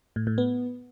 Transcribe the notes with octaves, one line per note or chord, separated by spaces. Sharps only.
A2
A2
B3